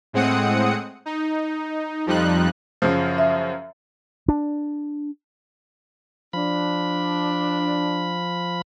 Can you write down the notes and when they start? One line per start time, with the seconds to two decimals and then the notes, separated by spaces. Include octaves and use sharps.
0.13 A2 G#3 C4 F#5 D#6 C#7
1.06 D#4
2.06 F2 F3 G3 D#4 F#6
2.82 F#2 C#3 F3
3.18 E5
4.28 D4
6.33 F3 D4 B5